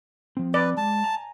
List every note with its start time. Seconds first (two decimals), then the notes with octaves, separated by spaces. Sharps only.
0.37 F3 C4
0.54 B4 D5
0.77 G#3 A5
1.04 G#5 A#5